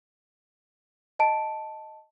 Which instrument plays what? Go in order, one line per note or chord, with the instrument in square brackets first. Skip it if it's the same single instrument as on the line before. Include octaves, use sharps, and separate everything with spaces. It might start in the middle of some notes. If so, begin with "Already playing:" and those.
[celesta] D#5 A5 D7